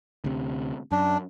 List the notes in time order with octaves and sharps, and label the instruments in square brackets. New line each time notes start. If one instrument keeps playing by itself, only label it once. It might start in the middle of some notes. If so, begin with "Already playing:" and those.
[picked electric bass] D2 C3
[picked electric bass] F#2 [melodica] D4